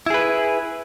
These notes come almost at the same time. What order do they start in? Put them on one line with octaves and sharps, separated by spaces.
E4 G#4 B4